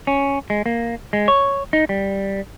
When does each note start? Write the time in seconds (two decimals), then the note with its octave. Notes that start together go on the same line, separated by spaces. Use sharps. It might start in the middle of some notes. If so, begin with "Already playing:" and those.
0.07 C#4
0.50 G#3
0.66 A#3
1.13 G#3
1.28 C#5
1.73 D#4
1.89 G3